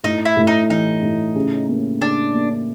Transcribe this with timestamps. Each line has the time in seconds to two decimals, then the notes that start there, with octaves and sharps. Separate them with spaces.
0.04 A2 D#4
0.25 E4
0.37 A2
0.47 D#4
0.69 E3 D#4
1.02 A2
1.35 C#3
1.69 A#3
2.01 C#3 D4
2.34 A#3